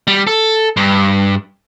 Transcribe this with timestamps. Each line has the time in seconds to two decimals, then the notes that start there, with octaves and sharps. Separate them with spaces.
0.07 G3
0.27 A4
0.77 G2